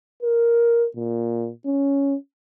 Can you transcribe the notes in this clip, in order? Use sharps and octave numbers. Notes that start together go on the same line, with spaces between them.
A#4
A#2
C#4